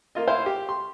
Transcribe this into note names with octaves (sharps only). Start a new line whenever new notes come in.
A#3 F4 D#5
E4 C5 F5
G4
C6